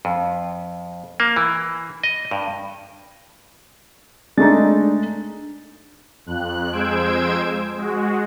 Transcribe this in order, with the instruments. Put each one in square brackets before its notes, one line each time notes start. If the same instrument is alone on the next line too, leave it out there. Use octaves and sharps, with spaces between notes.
[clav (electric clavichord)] F2
A#3
E3
D#5
G2
[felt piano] G#3 A3 D#4 [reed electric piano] D4 A6
[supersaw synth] F2 F#6
F2 G#3 C5 E6 G#6 D7
G#3 F#4